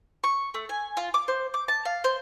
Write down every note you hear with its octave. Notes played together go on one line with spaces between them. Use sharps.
C#6
A3
G#5
F4
D6
C5
D6
A5
F5
C5